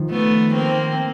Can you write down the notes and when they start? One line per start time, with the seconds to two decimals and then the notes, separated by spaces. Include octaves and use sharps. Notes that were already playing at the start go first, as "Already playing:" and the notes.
Already playing: D#3 F3
0.10 A3 B3
0.55 A#3 C4